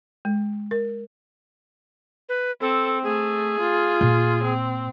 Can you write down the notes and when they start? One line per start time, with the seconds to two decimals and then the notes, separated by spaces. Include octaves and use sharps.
0.25 G#3
0.71 A#4
2.29 B4
2.61 C4 A4
3.04 A3 G#4
3.60 F4
4.01 A#2
4.43 C4